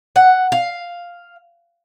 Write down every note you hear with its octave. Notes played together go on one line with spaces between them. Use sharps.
F#5
F5